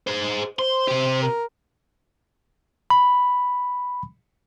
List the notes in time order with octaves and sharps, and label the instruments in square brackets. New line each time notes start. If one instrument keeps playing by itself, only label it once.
[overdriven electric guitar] G#4 C5
[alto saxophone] C5 [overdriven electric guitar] C6
[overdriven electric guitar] C3 G4
[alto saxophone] A#4
[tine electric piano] B5